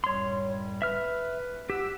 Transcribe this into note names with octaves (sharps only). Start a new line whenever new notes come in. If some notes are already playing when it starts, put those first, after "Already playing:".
F#2 A2 G3 C#5 C6
B4 E5 F6
G4 F#5 E6